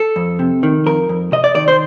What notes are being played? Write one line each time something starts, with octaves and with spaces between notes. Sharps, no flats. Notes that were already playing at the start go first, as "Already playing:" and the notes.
Already playing: A4
F2
C3
D#3
F2 A#4
F2
C3 D#5
D5
D#3 D5
C5